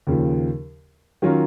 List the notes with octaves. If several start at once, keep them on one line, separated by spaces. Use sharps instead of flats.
D#2 C#3 F3
D#3 F#3 C#4 F4 A#4